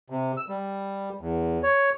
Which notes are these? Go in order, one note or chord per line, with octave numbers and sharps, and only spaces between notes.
C3
E6
G3
E2
C#5